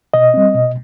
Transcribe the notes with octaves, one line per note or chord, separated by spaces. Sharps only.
B2 D#5
G3 C4
B2